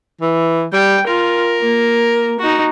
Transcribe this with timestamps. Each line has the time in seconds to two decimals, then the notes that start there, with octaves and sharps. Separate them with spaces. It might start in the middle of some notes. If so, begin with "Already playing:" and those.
0.21 E3
0.73 G3 G5
1.07 F4 A#4
1.60 A#3
2.39 D#4 F#4